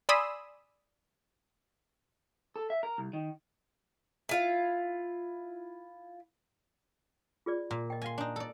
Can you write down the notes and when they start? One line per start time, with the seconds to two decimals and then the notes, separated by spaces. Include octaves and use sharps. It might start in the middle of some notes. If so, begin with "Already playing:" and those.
0.09 D5 G#5 B5 C6 D#6 E6
2.56 A4
2.70 E5
2.83 A#4
2.98 C2
3.13 D#3
4.29 E4 F4 F5
7.46 F4 G#4 D5
7.71 A#2
7.90 D#5 G5
8.02 E5 F5 G#5 C6
8.18 D4 D#4
8.36 A4 D5